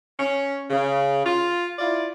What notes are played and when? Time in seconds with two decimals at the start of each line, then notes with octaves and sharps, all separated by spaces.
0.19 C#4
0.69 C#3
1.24 F4
1.79 E4 F4 D5